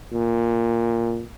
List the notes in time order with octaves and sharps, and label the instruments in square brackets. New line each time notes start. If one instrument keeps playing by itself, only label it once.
[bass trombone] A#2